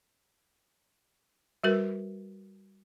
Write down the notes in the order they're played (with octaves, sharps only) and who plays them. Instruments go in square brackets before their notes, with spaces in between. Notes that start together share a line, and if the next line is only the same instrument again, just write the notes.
[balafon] G3 F#4 A#4 B4